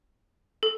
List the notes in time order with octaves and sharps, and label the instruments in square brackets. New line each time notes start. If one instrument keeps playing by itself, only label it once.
[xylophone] A4